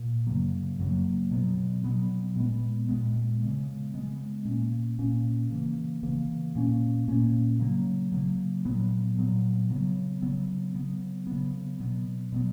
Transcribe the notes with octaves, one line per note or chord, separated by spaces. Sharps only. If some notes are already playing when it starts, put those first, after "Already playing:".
Already playing: A#2
F#2 C#3 F#3 A#3
F#2 C#3 F#3 A#3
B2 F#3 B3
B2 F#3 B3
A#2 G#3 B3
A#2 G#3 B3
C#3 G#3 B3
C#3 G#3 B3
A#2 A#3 C#4
A#2 A#3 C#4
C#3 E3 A#3
C#3 E3 A#3
A#2 A#3 C#4
A#2 A#3 C#4
C#3 F#3 A#3
C#3 F#3 A#3
A#2 F#3 B3
A#2 F#3 B3
C#3 F#3 B3
C#3 F#3 B3
C#3 F#3 B3
C#3 F#3 B3
B2 F#3 B3
B2 F#3 B3